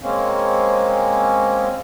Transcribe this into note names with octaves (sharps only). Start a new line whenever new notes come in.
G#3 A#3 C4 C#4